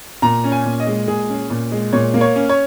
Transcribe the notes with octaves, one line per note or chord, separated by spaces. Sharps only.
A#2 A#5
C#4
G#5
A#2
D#5
G#3
A#2 G#4
C#4
A#2
G#3
A#2 C#5
A#3
C#5
C#4
C#5